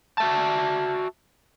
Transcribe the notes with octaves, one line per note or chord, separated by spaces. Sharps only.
F#4 E5 A5